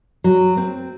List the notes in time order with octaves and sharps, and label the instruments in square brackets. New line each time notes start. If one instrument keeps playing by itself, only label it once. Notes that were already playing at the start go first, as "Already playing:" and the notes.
[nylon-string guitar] F#3
C4